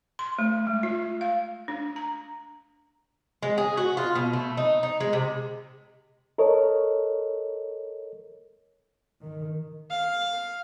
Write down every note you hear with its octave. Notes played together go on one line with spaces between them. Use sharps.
C6
A3
G#3
F4
F5
D4
A#5
G#3
G#4
F#4
F4
B2
A3
D#4
D#4
G#3
C3
A4 A#4 C#5 D#5
D#3
F5